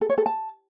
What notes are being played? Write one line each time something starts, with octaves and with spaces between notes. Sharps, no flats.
A4
C#5
A4
A5